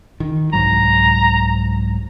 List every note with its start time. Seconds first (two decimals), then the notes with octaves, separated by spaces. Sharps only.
0.20 D#3
0.53 C2 G#2 F#3 A#5